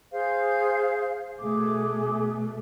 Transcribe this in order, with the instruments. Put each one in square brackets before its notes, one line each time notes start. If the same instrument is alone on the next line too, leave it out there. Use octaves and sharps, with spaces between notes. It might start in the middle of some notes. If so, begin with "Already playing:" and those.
[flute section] G#4 C5 F5
[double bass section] B2 A3 [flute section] G#4 D6